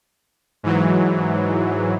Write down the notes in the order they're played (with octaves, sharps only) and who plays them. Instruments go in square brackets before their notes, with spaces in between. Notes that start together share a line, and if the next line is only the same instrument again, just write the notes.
[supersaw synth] G#2 E3 F#3